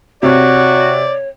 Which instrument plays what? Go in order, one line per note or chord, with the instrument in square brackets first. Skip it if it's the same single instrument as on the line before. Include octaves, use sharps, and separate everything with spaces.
[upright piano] C3 [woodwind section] F#4 [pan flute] C#5 [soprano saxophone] D5